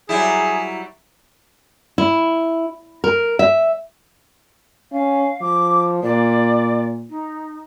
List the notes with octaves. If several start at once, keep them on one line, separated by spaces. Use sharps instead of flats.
F#3 G3 E4 G#4
E4
A#4
E5
C#4 F5
F3 D6
A#2 D5
D#4